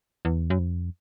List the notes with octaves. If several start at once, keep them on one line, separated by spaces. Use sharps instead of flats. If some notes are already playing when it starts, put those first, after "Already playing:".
E2
F#2
F2